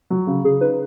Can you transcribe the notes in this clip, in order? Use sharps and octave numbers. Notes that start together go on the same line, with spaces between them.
F#3
C#3
C#3 G#4
D#4 B4